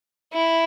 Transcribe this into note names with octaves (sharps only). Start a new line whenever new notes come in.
E4